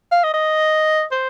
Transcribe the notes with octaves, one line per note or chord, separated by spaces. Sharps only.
F5
D#5
D#5
C5